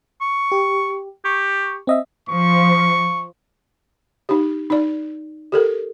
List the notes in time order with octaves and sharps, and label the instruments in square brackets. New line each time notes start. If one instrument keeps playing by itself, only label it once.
[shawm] C#6
[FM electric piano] G4
[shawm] G4 [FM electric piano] C#6
[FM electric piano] C4 D#5 E5
[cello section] F3 [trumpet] C#6
[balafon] D#4 G4
D#4 D5
G4 A4 A#4